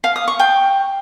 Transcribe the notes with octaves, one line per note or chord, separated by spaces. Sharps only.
F5
D#6
C#6
G5